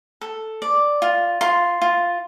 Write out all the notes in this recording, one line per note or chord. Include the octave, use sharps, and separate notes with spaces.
A4
D5
F4
F4 C6
F4